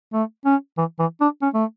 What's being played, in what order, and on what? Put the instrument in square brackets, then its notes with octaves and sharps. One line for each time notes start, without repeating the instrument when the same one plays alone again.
[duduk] A3
C#4
E3
E3
D4
C#4
A3